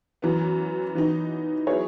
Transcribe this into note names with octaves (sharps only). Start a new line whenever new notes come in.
F#2 E3 B3
E3 B3 D#4
F#3 B3 E4 G#4 C#5